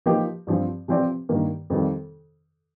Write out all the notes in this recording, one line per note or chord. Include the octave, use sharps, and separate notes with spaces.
F3 A#3 D#4 G4
G2 F3 C4
C3 F3 C4 G4 D5
G2 D#3 A#3
F2 C3 D#3 G3